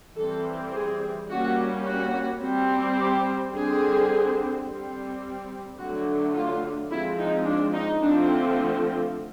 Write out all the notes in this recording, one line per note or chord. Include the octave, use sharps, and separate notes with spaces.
E3 G3 C4 A4
G#4
G3 A#3 C#4 F#4
F#4
G3 C4
G4
D3 G3 C4 G#4
G3 C4
D3 F#3 A3 D4 F#4
F4
F3 G#3 C4 E4
D#4
D4
D#4
D3 F3 A3 C4 D4